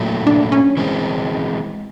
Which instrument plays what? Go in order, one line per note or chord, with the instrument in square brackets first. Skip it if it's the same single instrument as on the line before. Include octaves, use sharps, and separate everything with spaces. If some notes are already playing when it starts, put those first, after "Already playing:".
Already playing: [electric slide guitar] A#2 F#3 A3
[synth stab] D4
C#4
[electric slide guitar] E3 G#3 C4